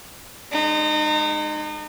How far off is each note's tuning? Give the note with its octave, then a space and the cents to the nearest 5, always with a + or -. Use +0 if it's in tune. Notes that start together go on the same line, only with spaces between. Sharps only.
G#3 +0 D#4 -35